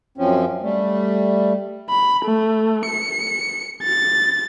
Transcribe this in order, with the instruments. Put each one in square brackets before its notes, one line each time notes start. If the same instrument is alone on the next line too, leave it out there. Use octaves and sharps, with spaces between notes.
[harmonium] F#2 F3 C4 C#4
G3 A3
[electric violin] B5
A3
C#7
A6